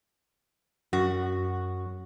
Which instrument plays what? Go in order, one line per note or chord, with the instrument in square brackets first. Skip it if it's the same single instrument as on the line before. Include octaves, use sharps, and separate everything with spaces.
[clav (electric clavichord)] F#2 [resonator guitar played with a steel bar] F#4